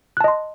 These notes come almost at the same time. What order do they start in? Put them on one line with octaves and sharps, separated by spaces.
F#6 A5 D#5 C6